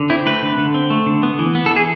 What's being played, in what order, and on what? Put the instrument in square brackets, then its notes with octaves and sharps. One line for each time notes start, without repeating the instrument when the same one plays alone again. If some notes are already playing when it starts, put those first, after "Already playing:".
Already playing: [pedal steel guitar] D3
C4 E4
A3 B4
D3
D3
C4
A3
D3
B3
E3
B3
A4
E3
G#4